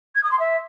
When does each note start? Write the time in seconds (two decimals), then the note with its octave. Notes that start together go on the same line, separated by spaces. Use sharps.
0.15 G#6
0.23 D#6
0.31 C6
0.40 E5